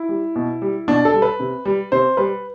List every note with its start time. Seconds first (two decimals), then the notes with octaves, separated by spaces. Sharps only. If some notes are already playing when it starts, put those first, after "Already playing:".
Already playing: E4
0.09 G3
0.36 B2
0.62 G3
0.88 B2 D4
1.05 A4
1.14 G3
1.22 B4
1.40 C3
1.65 G3
1.92 C3 C5
2.17 G3 B4